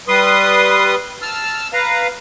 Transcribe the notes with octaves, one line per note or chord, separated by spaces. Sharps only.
G3 B4 C6 D#6
A5 E6 F6
B4 F5 A#5